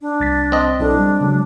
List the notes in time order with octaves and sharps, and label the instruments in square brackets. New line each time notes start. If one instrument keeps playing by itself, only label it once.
[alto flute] D4
[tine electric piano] C2 A6 B6
[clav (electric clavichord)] C4 D#5
[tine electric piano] B1 E4 A4 [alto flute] D4
[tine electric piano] G3
C#3 F#3 G#3